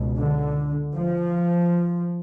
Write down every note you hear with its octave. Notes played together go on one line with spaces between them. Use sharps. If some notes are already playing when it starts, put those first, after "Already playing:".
Already playing: C#2 B2
D3
F3